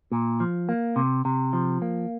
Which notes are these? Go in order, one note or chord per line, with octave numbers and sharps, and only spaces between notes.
A#2
F3
A#3
C3
C3
F3
A#3